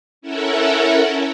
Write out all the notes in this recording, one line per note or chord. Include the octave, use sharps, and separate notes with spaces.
C#4 E4 A4 A#4 E5 F#5